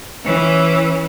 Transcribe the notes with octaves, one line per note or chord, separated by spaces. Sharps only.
E3 C#4